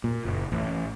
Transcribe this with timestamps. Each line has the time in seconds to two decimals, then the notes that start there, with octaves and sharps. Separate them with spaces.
0.04 A#2
0.25 F#1
0.52 A1